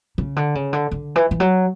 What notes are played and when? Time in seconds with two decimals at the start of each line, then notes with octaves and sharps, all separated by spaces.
0.18 C#3
0.36 D3
0.55 C#3
0.73 D3
0.91 D3
1.16 E3
1.31 E3
1.40 F#3